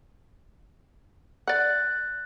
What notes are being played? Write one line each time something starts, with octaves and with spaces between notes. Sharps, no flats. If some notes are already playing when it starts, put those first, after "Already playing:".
D5 F#5 F#6 A6